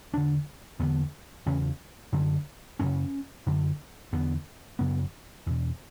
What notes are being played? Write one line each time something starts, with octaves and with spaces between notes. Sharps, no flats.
E2 D3 D4
E2 D3 B3
E2 C#3 C#4
F#2 D3
F#2 C#3 C#4
F#2 D3
E2 D3 B3
F#2 C#3 B3
E2 B2